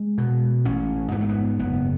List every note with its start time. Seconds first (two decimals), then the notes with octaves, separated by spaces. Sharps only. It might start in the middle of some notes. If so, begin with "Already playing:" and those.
Already playing: G#3
0.18 B2
0.65 A1 C#4
1.11 G#2 B3
1.21 A3
1.29 B3
1.59 F#1 B3